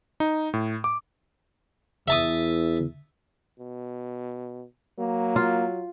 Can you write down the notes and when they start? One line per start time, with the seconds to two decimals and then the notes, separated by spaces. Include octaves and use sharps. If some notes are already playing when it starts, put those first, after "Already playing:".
0.20 D#4
0.54 A2
0.84 D6
2.08 E2 E5 A5 D#6
3.59 B2
4.99 F#3 A#3
5.36 F4